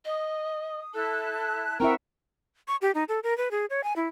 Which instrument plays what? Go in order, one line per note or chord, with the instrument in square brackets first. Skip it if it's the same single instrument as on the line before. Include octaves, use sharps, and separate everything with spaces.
[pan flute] D#5 [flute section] D#6
[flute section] E4 A5 F#6 [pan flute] A4
[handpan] C4 E4 E5 [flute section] F#4 F#5 C#6 [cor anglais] A#4 [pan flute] G5
[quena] C#6
G4
D#4
A4
A#4
B4
G#4
C#5
G#5
E4